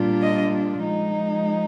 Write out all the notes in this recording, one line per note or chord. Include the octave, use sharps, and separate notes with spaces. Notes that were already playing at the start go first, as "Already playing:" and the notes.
Already playing: A#2 G3 D4 F4
D#5
F3 G#3 D#4